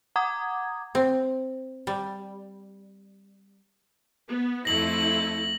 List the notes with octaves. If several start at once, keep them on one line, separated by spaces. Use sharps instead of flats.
F#5 A#5 D6 D#6 G#6
C4
G3
B3
F2 A3 E4 A4 A#6 F#7